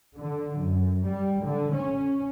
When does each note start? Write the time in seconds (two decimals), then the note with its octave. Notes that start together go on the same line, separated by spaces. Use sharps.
0.19 D3
0.59 F#2
1.08 G3
1.46 D3
1.76 C#4